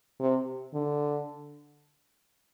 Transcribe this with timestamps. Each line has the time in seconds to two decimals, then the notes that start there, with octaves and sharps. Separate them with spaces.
0.20 C3
0.74 D3